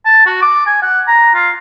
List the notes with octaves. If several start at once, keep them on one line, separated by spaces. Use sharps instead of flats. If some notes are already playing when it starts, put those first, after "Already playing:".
A5
F#4
D6
G#5
F#5
A#5
F4